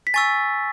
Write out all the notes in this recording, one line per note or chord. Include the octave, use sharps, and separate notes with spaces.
B6
G#5 C#6 E6 A6